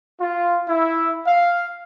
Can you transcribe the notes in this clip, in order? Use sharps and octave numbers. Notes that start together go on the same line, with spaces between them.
F4
E4
F5